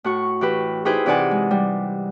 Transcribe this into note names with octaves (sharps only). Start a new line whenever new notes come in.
A2 F#4 C#6
E3 G4 B4
D#4 E4 G4 G#4 B4 C5
C3 E3 D#4 D5 F#5 G#5
G#3
G3